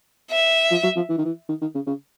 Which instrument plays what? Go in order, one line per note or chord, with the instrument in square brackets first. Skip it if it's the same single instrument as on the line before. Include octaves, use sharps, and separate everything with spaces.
[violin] E5
[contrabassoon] F3
F#3
F3
E3
D#3
E3
D#3
D#3
C#3
C#3